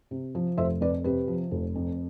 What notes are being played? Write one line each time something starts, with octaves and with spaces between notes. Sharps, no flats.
C3
F3
F1 C5 E5
F2 B4 D5
C3 G4 B4
F3
F1
F2